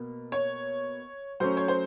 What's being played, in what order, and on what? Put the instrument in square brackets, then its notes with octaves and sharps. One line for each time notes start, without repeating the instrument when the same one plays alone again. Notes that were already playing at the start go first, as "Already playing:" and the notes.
Already playing: [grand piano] B2 A#3
[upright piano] C#5
[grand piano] F#3 A3 C#4 [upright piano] C5
[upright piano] C#5
C5